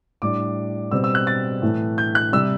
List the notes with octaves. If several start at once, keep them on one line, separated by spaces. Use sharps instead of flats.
A2 G3 D4 D6
B2 G3 C4 E6
E6
F#6
A6
A2 E3 A3
G6
F#6
C3 G3 E6